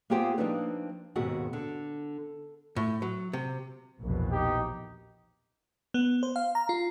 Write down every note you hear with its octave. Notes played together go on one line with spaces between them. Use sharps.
A#3 B3 F4 G4 G#4 C5
F3 A#3 C4 D4 D#4 B4
D#2 G#2 B2 C4 F#4 G#4
D3
A2
F#3
C3
A#1 E2 B2
D#4 G4
B3
C5
F5
A#5
F4